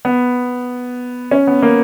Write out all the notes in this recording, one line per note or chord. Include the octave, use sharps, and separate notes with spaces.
B3
C#4
B3
A#3